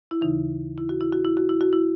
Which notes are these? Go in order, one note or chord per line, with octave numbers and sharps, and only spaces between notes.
E4
D#2 C#3 E3 D#4
E4
F#4
E4
F#4
E4
F#4
E4
F#4
E4